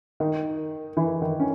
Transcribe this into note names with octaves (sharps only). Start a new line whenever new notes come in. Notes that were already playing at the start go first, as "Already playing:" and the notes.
D#3 D#4
E3 E4
D#3 D#4
C#4